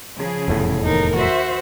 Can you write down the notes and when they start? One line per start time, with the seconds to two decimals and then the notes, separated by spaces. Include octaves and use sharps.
0.18 C#3 F3 G#4
0.48 F1 E2 A2
0.83 D#2 D#4 A#4
1.15 F#4 C5 E5